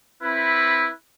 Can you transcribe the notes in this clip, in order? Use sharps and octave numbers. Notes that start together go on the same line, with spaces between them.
C4 E4 B4 E5